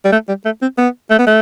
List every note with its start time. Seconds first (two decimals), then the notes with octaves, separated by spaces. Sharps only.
0.05 G3
0.12 A3
0.28 G3
0.45 A3
0.62 C4
0.78 B3
1.10 A3
1.19 B3
1.27 A3